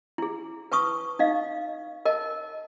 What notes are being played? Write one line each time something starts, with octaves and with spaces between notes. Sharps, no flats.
E4 G#4
B4 A5 C#6 D#6
D#4 D#5 F5
A#4 D#5 A5